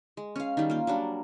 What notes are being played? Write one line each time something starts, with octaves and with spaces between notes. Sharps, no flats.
G#3
C#4 F5
D#3 G3
A#3 F4
F#3 G3 D4